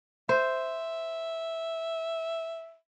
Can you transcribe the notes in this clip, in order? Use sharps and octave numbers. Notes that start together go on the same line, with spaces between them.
C5 E5